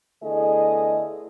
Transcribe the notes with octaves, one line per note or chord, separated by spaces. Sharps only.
E2 D3 A3 E4 G#4 D#5